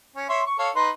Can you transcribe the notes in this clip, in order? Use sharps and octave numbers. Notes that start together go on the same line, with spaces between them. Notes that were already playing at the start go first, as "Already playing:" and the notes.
C#4
C#5 E5 C6
C#6
A4 C#5 F5
D#4 B4 C6